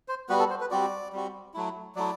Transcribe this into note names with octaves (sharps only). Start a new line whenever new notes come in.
C5
G3 B3 F#4 B4
A4
C5
B4
G3 C4 F#4 D5
G3 C4 F#4
F#3 A3 E4
F#3 A3 E4 D5